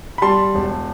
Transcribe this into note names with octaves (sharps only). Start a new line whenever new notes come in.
B5
G3 A5 C6
E1